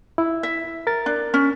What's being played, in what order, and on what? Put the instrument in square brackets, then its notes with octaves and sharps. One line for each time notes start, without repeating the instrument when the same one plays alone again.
[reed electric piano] E4
[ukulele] E5
[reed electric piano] A#4 A6
[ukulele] D4
C#4